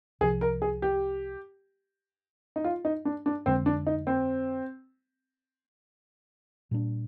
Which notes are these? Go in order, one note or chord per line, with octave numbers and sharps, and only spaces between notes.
C2 C3 F3 G#4
A#4
G#4
G4
D#4
F4
D#4
D4
D4
F2 D3 G#3 C4
D4
D#4
C4
A#2 G3 A#3 D4